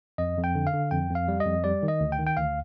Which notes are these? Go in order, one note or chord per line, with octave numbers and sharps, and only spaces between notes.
F2 D#5
F2
G5
D3
F5
D3
F2 G5
F2
F5
G3
D#5
F2
G3 D5
D#3
D#5
D2
G5
D#3
G5
D2 F5